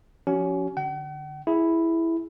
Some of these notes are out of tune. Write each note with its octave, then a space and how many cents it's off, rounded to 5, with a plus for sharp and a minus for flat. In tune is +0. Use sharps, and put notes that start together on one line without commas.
F3 +10 C#4 +20 F#4 +40
D3 +5 F#5 +45
E4 +0 G#4 +0